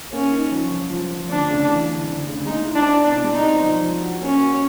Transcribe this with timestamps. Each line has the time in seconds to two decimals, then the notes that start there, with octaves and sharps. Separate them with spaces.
0.12 A#3 C#4
0.32 D#4
0.51 F3
0.70 F3
0.90 F3
1.10 F3
1.29 D2 D4
1.49 C#3
1.69 E3
1.88 D2
2.07 D2
2.27 C#3
2.46 G#3 D#4
2.65 E4
2.75 D4
2.85 E4
3.04 B2 D4
3.24 G#3
3.34 D#4
3.43 C4
3.62 F3
3.82 F3
4.02 F#4
4.21 A#3 C#4
4.40 F#4